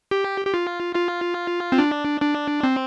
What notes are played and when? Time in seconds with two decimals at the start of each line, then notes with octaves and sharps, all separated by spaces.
0.11 G4
0.46 G4
0.54 F4
0.95 F4
1.72 C4
1.78 D4
2.22 D4
2.63 C4